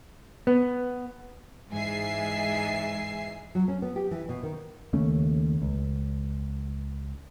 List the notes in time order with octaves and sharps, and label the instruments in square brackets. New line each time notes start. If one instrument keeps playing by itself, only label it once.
[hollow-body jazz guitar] B3
[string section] G#2 E3 G#3 E5 G#5 C7
[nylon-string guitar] F#3
C#4
B3
G4
E3
B2
D#3
[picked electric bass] D#2 C#3 A3 C#4
C#2